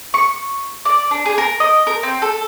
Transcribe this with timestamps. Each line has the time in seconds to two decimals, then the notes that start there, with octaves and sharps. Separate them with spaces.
0.14 C#6
0.85 D5
1.11 D4
1.26 G#4
1.38 A#4
1.60 D#5
1.87 A#4
2.03 C4
2.22 A4